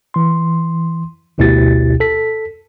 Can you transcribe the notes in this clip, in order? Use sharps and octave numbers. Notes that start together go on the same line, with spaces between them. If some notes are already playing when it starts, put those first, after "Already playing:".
E3 C6
A1 D2 B2 E4 G4 A6
A4 B6